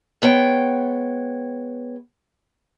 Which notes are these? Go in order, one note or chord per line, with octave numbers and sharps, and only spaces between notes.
G#3 B3 C#5 G5